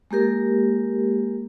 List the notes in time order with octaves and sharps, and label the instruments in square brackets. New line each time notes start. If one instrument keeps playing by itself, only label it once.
[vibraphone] G#3 A#3 G4 A#4